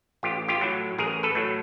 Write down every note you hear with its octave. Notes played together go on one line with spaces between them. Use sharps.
A1 F4 G4
F4 G4
A2 F#3
A1 G#4 A#4
A4 B4
A2 F#3